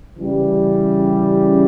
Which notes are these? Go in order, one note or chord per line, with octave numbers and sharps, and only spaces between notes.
C#3 E3 G3